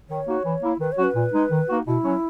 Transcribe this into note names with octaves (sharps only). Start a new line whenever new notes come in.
D#3 C#5
A#3 D#4 F#4
E3
A#3 E4
D#3 B4
C#5
F#3 C#4 F#4
B4
A#2
G#3 D#4
D#3
A#3 D#4 F#4
B2 E4
F#3 C#4